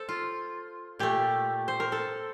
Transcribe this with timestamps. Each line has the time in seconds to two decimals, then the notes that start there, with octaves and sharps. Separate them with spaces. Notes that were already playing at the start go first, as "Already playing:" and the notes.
Already playing: A4 C5
0.09 F4
0.99 A#2 A3 G4
1.68 C5
1.80 A#4
1.92 A4